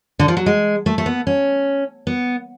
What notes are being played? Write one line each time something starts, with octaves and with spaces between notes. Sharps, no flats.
D3
F3
F#3
G#3
A3
A3
B3
C#4
B3